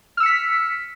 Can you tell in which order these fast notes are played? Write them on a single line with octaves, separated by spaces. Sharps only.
F6 E6 C#7 B6